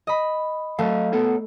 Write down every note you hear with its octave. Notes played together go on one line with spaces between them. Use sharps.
D#5 B5
F#3 A3 D#5 F5
B3 A4 C#5